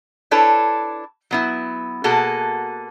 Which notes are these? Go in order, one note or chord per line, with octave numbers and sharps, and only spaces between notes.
D4 E4 A4 B4 C#5
F#3 B3 E4
B2 A#3 F#4 G#4 A4